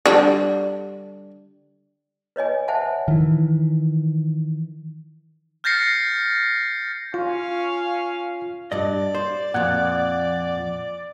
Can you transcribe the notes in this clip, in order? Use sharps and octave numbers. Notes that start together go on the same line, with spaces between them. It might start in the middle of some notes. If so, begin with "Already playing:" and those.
D3 G3 D4
B4 C#5 D#5 G#5
C5 E5 F#5 G#5 A5
D#3 E3
F6 G6 A6 A#6 C7 C#7
C#4 F4 F5
G2 D5 D#5
C5
F2 A#2 F#5 F#6 G#6